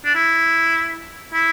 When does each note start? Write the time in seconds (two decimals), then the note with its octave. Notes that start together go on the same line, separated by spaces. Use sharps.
0.05 D4
0.15 E4
1.33 E4